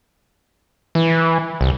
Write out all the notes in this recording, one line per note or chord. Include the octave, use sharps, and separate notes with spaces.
E3
C2